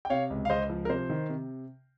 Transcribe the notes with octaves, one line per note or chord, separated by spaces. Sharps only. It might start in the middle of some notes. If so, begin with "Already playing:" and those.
G5
C3 C#5 F5
C#2
F5
C#2 C5 D#5
F3
A#4
C3 C5
D#3
C3